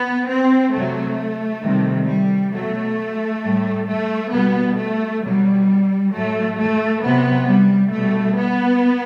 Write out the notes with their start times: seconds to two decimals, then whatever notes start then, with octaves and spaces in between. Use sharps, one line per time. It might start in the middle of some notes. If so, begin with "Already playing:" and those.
Already playing: B3
0.29 C4
0.73 C3 F#3 A3
1.63 C3 D#3 G3
2.08 G3
2.53 B2 F#3 A3
3.43 A2 G3
3.87 A3
4.33 B2 G3 B3
4.78 A3
5.23 B2 F#3 G3
6.12 A2 F#3 A3
6.57 A3
7.02 C3 F#3 B3
7.47 G3
7.92 B2 G3 A3
8.37 B3